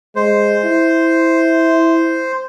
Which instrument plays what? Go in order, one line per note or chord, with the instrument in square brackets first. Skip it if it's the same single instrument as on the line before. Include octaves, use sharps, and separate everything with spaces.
[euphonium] G#3 [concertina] C5
[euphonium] E4